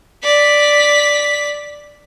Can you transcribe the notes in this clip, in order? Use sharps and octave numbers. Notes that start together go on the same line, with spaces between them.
D5 B6